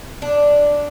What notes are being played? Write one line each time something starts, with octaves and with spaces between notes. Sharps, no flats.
D4